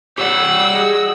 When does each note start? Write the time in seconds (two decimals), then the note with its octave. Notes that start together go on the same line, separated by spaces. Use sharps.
0.18 G4 C#5 D5 F#5 E6
0.73 F#4 G#4 D#5